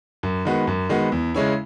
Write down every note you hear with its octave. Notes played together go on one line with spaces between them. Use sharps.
F#2
D#3 G#3 B3 F#4
F#2
D#3 G#3 B3 F#4
E2
C#3 G#3 C#4 E4